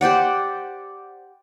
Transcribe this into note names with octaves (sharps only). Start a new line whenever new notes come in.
G4 C5 D5 F#5